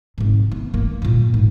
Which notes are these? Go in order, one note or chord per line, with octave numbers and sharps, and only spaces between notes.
G#2 C3
B3
G2 A#3
G2 A#2
G#2